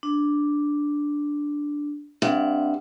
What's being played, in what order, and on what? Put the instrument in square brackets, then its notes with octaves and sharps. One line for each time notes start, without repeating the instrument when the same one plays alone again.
[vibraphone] D4
[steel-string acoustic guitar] G2 [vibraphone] C4 E5 F#5